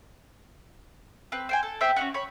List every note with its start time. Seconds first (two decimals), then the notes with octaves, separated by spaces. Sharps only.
1.32 C4 B4
1.49 C5 G5 G#5
1.63 A4
1.81 C5 E5 G5
1.96 C#4 D#4 F#4
2.14 C#5 B5